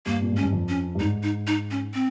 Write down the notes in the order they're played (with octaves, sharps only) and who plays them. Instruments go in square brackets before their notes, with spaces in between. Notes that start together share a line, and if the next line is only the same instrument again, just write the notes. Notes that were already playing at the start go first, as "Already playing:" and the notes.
[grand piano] G2 [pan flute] A#3
[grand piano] A#2
[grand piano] G#2 [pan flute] C#4
[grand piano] G2
F2
[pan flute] C#4
[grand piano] G2
[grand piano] G#2 [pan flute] D#4
[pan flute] D#4
D#4
C#4
C4